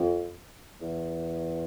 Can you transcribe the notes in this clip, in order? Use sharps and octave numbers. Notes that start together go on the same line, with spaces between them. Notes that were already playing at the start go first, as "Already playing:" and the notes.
Already playing: F2
E2